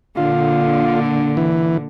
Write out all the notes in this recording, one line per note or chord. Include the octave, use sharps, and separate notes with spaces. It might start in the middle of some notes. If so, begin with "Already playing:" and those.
A#2 D3 F4
E3